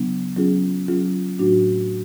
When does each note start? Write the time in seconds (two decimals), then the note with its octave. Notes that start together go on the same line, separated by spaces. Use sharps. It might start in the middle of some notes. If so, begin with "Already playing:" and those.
Already playing: C#3 F#3 B3 D4
0.37 F#3 C#4 F4 G#4
0.88 F#3 C#4 F4 G#4
1.39 A2 F#3 A3 D4 F#4